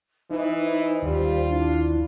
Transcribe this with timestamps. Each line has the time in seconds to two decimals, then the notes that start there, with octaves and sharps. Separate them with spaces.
0.31 E3 D#4 C5
1.02 D#2 G3 F4
1.49 D4 E4